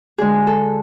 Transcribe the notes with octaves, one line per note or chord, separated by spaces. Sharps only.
D2 D3 G#3 G#4
A4